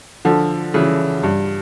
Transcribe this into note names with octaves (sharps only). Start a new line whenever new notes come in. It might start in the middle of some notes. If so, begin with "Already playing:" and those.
D3 F3
C#3 E3
G2